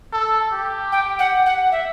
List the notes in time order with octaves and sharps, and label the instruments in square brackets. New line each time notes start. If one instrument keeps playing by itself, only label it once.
[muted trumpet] A4
G4
[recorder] G5
F#5
F#5
E5